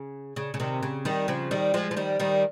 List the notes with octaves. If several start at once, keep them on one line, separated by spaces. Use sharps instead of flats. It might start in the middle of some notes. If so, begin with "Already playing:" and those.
Already playing: C#3
C#3
C#3
C3 D#3
C#3
D#3 G3
C#3 F3
D#3 G3
F3 G#3
F3
D#3 G3
D#3 G3